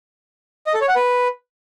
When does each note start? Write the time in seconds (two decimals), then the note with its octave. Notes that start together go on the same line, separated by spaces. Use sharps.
0.67 D#5
0.74 A4
0.81 C#5
0.88 F#5
0.96 B4